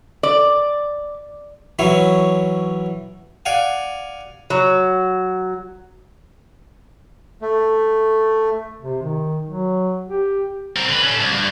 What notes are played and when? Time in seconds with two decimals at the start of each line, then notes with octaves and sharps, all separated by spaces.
0.23 D5
1.79 E3 F#3 C#4 E4 C#6
3.46 D5 F5 F#5 G#5
4.50 F#3
7.42 A3
8.82 C3
9.03 D#3
9.49 F#3
10.09 G4
10.76 C4 A#4
10.89 D3 B4
11.01 C#4 A4
11.20 C2
11.33 G2